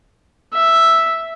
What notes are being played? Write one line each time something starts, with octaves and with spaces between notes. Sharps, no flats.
E5